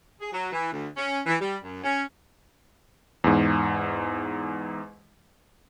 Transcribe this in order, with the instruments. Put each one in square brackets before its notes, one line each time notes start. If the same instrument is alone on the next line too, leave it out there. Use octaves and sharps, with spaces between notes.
[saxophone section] G#4
F#3
E3
D2
C#4
E3
G3
F#2
C#4
[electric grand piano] E2 G#2